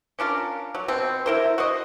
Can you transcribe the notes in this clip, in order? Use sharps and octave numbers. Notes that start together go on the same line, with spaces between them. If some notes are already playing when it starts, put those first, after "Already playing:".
C#4 D4 F4 A#4
F#3
B2 C4
E4 A#4 C5
F#4 C5 D#5